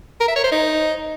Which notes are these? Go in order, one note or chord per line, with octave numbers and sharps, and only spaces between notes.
A#4
E5
C#5
C5
D#4